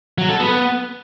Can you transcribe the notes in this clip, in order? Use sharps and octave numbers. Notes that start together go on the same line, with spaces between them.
F#3
A4
B3